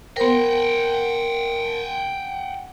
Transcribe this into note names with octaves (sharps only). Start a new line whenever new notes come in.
B3 A#4 C5 F#5 G5 C6